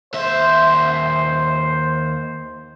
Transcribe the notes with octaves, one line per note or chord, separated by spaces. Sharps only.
D#2 C5 E5